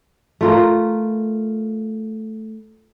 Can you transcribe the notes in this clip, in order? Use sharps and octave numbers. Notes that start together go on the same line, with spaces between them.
A3 F4 A#4